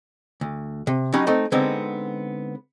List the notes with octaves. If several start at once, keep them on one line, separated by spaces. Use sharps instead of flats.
D2
C3
F#3 C#4 D#4 G4 D#5 B5
A3 C4 D#4
D3 G#3 B3 C4 D#4